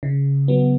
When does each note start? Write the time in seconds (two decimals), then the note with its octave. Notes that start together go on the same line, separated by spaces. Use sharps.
0.03 C#3
0.48 F#3 B3